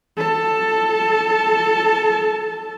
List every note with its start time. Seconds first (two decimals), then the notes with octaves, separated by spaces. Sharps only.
0.17 A4 A5